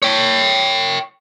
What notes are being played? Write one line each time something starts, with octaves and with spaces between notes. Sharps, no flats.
C#5 G5